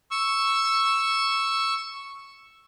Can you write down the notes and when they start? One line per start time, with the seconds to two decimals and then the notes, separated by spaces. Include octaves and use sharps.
0.11 C#6 E6